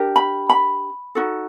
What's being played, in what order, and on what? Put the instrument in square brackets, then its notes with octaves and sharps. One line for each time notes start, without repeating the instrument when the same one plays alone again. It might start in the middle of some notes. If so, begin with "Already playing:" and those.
Already playing: [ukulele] D4 G4 A#4
B5
B5
D#4 F#4 A4